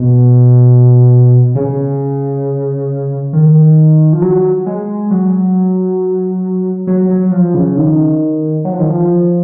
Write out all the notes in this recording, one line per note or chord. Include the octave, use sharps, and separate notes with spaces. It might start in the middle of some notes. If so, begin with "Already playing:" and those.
Already playing: B2
C#3
D#3
F3
F#3
G#3
F#3
F#3
F#3
F3
C#3
D#3
F#3
F3
D#3
F3